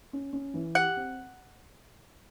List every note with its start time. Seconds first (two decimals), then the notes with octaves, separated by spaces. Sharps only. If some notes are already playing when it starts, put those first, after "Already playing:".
0.13 C#4
0.33 C#4
0.54 E3
0.75 G4 F#5
0.97 C4